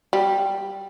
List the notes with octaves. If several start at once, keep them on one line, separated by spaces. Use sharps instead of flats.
G3